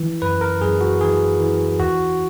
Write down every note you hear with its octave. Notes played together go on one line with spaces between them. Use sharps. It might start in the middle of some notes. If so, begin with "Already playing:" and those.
Already playing: E3
F#2 B4
A#4
F#2 G#4
F#4
E3 G#4
E3
E2 F#4